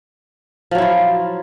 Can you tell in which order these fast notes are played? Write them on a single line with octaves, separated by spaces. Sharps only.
F3 F#3 E4 F4